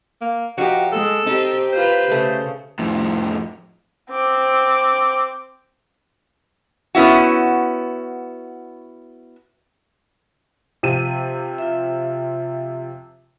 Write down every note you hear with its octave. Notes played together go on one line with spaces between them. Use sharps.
A#3
F3 D#4 F#4 G4
G#3 A4
C4 D#4 G4
F4 G4 B4 C5
C#3 A3
F2 A2
C4 D6
B3 C#4 E4 F#4
C3 F3 D#7
F4 E5